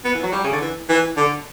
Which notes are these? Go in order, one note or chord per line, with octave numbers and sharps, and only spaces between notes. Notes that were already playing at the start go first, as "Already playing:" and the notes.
B3
E3
F#3
G3
C#3
D3
E3
E3
D3